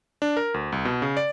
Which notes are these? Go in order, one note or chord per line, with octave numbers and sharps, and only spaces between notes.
D4
A#4
D2
C2
B2
C#3
D5